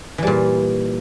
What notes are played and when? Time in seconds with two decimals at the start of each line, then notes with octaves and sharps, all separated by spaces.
0.18 E3
0.23 G3
0.27 A#2